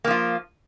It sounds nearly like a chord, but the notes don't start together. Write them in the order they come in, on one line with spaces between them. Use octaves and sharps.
A#3 F3 F4